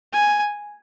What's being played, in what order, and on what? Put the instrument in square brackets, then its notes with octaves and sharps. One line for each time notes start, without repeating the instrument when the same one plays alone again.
[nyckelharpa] G#5